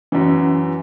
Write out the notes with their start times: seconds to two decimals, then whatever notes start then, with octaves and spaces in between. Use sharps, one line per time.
0.12 F#2 E3